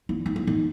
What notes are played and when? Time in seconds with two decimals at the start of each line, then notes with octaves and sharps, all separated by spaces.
0.09 E4
0.26 D#4
0.36 E4
0.47 D#4